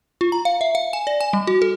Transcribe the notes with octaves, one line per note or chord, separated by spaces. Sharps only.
F4
A#5
F5
E5
F5
G#5
D5
G#5
G3
F#4
A4